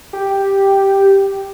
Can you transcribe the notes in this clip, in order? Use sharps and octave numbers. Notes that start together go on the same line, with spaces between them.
G4